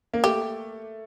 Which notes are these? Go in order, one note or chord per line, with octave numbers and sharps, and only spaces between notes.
A#3
A3 G4